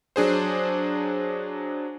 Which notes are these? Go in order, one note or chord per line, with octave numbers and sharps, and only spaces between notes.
F#3 D4 G#4 C5